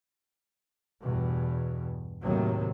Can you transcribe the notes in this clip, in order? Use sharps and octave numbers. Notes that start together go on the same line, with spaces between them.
E2 G2 B2
D#2 A2 C3 D#3 F#3